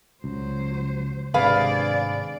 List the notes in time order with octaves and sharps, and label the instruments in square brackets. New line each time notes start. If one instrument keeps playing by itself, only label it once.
[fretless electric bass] C#2 [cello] F#3 C5
[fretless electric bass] G#1 C3 [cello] D4 D5 [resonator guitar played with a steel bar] G#4 B4 F5